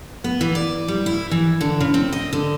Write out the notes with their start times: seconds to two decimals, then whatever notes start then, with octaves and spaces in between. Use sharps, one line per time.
0.24 B3
0.41 E3
0.55 D5
0.88 G3
1.06 E4
1.31 E3
1.61 D3
1.80 C#3
1.94 C4
2.13 D#5
2.33 D3